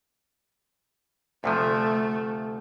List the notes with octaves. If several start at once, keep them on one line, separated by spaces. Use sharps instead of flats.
D2 C3 F3 A3